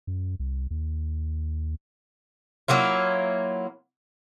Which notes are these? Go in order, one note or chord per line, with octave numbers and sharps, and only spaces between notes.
F#2
C2
D#2
F#3 A#3 E4 F4